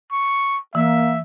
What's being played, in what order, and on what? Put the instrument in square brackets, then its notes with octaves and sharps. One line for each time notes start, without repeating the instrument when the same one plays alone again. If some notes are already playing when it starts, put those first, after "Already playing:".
[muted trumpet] C#6
[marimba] E3 [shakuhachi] A#3 [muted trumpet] E5